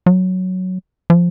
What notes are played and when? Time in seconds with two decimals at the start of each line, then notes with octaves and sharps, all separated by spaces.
0.06 F#3
1.10 F3